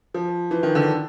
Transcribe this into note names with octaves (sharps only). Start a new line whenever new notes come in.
F3
E3
D#3
D3